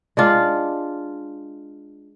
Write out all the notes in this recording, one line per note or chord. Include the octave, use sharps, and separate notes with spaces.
G#3 D4 F4